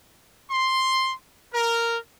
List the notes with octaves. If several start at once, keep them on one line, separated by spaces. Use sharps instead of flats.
C6
A#4